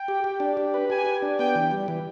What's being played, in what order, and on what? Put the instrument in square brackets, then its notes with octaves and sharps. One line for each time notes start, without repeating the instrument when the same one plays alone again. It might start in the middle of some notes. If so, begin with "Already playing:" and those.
Already playing: [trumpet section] G5
[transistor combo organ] G4
G4
D4
G4
B4
[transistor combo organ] G4 [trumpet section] G#5
[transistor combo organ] G4
D4
[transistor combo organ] B3 [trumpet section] G5
[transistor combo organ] E3
G3
E3